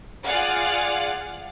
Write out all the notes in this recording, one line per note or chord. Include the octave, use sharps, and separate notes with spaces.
F4 G#4 D5 F5 F#5